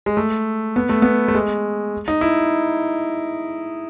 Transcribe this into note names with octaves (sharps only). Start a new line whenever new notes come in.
G#3
A3
B3
A3
B3
A3
G#3
D#4
E4